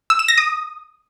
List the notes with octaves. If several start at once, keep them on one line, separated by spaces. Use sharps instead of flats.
E6
E7
A#6
D#6